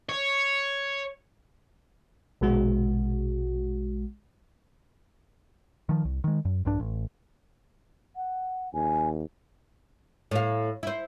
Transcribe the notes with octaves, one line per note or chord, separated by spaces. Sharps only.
C#5
A#1 B2 G#3 F#4
D#3 F3
C2
D#3 G#3
F#2
A#1 G2 D4
A1
F#5
D#2 G#5
A2 F5
E4 C5